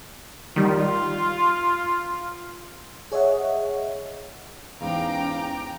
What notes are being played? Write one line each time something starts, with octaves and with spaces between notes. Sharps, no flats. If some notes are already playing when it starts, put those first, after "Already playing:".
D#3 G3 F4
G#4 C#5 D#5 E5 F#5
E2 G#2 C#4 F5 G5 A#5 D6